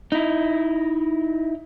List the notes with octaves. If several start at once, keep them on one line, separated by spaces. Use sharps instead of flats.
D#4 E4